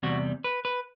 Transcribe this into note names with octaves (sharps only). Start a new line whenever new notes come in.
E2 C3 G3 F#4
B4
B4